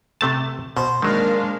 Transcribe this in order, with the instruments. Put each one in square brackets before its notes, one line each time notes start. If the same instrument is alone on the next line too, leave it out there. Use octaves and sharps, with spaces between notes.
[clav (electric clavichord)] C3 A3 A5
[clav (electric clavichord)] B2 [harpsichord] C5
[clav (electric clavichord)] D#3 F#3 [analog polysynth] G#3 D4 F5 [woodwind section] A#3 A#4